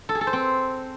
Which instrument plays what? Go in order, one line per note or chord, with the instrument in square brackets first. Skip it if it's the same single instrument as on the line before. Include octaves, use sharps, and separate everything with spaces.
[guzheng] A4
G#4
A4
C5
C4